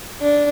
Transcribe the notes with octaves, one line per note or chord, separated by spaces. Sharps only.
D4